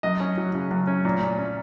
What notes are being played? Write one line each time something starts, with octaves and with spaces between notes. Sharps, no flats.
F#2 D#5
C#4
F#3
C#3
F#2
C#4
A#2
A#2
C#4